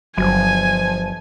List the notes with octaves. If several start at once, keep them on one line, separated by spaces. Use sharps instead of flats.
G1 F3 F#3 G#5